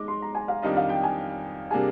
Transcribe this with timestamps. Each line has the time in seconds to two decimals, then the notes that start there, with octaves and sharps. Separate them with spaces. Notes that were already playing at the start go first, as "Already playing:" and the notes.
Already playing: G#3 D#4 D6
0.08 C6
0.22 A#5
0.35 G#5
0.48 F5
0.62 F2 D#3 G3 D4 F4 D#5
0.77 F5
0.89 G5
1.03 G#5
1.71 C3 G3 A#3 D4 G#4 G#5